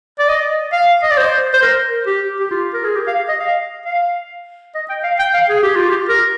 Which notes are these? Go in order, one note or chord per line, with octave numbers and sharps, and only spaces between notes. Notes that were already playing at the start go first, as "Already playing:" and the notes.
D5
D#5
F5
D#5
D5
C5
C5
A#4
G4
G4
F4
A#4
G#4
G4
F5
D#5
F5
F5
D#5
G5
F5
G5
F5
G#4
G4
F4
G4
A#4